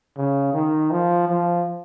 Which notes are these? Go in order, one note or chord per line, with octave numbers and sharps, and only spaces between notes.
C#3
D#3
F3
F3